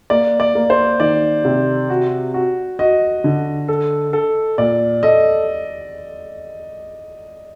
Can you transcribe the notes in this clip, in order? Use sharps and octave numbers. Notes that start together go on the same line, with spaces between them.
A#3 D5
D5
A#3
C5
D#3 D5
C3
F#4
F#4
F#4 D#5
D3
A4
A4
A#2 D5
A4 D#5